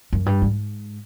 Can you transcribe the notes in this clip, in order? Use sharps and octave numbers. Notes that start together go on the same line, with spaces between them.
F#2
G2
G#2